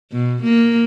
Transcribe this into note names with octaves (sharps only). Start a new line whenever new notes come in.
B2
A#3